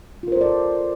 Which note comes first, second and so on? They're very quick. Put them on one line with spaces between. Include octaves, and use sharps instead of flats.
F4 A#4 C5 A4 D5